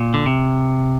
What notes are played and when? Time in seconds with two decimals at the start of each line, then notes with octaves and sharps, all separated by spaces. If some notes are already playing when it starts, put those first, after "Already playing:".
Already playing: A#2
0.14 D3
0.26 C3